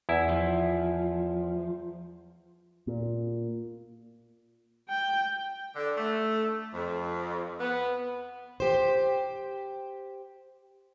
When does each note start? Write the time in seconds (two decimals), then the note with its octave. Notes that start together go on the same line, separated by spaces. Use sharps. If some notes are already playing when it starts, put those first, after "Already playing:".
0.09 E2 E4
0.29 F3
2.87 A#2
4.89 G5
5.76 D3
5.97 A3
6.74 F2
7.60 B3
8.60 G4 C5